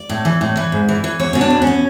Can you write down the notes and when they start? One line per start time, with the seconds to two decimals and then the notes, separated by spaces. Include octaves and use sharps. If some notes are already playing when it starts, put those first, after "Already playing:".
Already playing: D5
0.09 A2
0.25 E3
0.41 A2
0.57 E3
0.72 G#2
0.89 E3
1.04 E3
1.19 E2 C#5
1.33 B2 C#4
1.41 D4
1.50 E2
1.62 C#4
1.67 B2